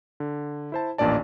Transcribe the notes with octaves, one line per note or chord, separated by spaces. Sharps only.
D3
E4 C5 A5
A1 D#2 A#2 D4 D5 A5